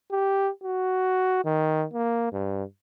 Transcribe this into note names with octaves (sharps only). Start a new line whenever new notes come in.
G4
F#4
D#3
A#3
G2